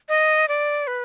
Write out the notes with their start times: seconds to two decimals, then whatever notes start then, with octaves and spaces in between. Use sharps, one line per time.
0.09 D#5
0.48 D5
0.87 B4